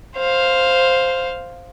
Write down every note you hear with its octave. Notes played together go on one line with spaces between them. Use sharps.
C5 F5